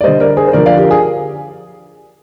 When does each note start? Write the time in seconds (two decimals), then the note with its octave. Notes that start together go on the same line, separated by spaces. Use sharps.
0.01 D5
0.04 D3 G3 C5 D#5
0.20 A#4 D5
0.37 G#4 C5
0.47 C5
0.53 D3 F3 A#4 D5
0.66 D5 F5
0.78 G4 A#4
0.91 G#4